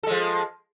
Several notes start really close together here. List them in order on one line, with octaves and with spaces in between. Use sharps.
A4 G#3 F3